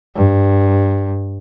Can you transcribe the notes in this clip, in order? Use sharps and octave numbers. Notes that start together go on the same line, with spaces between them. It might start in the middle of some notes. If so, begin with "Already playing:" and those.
G2